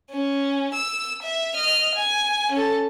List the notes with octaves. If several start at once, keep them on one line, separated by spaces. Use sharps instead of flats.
C#4
E6
E5
D#5 F6
G#5
C#4 A4